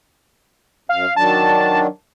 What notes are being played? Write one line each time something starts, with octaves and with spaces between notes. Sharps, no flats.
F#2 F5
D#3 F#3 D4 A5